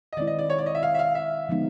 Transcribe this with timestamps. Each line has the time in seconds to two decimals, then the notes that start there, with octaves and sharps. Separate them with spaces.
0.13 D#5
0.17 D#3 G#3 C4 E4 D5
0.27 D#5
0.39 D5
0.50 C#5
0.59 D5
0.66 D#5
0.75 E5
0.83 F5
0.94 E5
0.99 F5
1.15 E5
1.48 D3 F3 G#3 B3 D#4